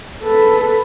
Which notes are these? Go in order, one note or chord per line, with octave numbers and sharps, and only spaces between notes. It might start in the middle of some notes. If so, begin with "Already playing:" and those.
A4 B4